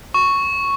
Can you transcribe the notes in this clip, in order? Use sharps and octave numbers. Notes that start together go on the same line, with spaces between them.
C#6